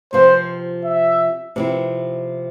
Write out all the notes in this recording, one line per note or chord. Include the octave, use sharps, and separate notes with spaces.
C3 F3 C4 F4 C5
E5
C3 F3 C4 E4